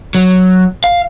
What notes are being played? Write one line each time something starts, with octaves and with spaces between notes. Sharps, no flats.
F#3
F5